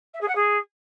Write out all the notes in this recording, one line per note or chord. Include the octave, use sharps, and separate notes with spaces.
E5
G#4
F#5
G#4